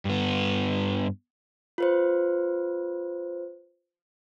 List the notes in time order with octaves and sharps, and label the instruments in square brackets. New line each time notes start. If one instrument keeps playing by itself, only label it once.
[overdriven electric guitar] G2 B3
[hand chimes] F4 B4 C5